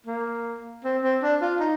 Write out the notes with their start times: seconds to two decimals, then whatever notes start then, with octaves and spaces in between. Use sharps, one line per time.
0.07 A#3
0.84 C4
1.03 C4
1.23 D4
1.42 F4
1.60 D#4